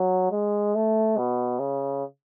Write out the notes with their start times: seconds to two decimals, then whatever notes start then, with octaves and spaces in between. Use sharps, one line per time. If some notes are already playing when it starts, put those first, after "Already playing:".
Already playing: F#3
0.32 G#3
0.75 A3
1.17 B2
1.59 C#3